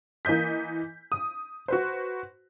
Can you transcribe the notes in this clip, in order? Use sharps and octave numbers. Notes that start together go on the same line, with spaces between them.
E3 A#3 D#5 G6 B6
D#6
F#4 B4 C5